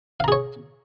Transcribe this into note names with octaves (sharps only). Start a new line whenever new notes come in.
G#4 C#5 F5 A#5